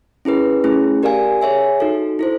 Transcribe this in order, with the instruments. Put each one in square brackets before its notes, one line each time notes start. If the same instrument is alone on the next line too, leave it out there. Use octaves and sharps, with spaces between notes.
[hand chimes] C#4 E4 G#4 B4
A3 C#4 E4 G#4
G4 A#4 D5 F5 G#5
G#4 C#5 E5 G#5
D#4 F#4 A4
E4 A4 C5